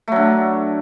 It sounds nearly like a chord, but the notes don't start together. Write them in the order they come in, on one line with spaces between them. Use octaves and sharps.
A3 F#3 D3